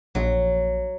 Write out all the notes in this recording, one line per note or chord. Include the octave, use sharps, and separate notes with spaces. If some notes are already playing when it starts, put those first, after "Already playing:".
A#1 F#3